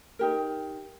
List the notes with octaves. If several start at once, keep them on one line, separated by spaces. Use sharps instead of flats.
D#4 G4 A#4